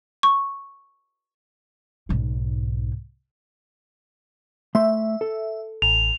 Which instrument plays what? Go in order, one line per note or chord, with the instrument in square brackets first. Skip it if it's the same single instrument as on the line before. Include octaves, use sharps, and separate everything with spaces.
[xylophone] C#6
[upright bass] B1 G#2
[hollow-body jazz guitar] A3 C6 [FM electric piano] E5
[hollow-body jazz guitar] A4
[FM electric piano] A1 [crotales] F7